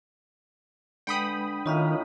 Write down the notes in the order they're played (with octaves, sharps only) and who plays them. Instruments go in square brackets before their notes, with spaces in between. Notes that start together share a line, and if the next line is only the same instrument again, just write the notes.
[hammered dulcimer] D3 [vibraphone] G#3 B4 [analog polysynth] G5 B5 D#6
[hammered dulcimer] A2 C#4 D#4 [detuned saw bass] D#3 [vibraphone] F4 D#5 F5